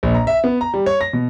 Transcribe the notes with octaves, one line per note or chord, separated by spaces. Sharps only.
A#1
A#5
E5
B3
A#5
G3
C#5
A#6
B2